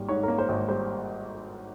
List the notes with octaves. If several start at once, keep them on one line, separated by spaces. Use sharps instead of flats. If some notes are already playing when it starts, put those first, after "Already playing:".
Already playing: G#1 G3 A#3
G#2 C#5
A#3 A#4
C5
G#1
G3 C5